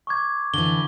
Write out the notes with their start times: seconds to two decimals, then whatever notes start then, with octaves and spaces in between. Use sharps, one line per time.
0.07 C#6 D6 G#6
0.54 D3 E3 G7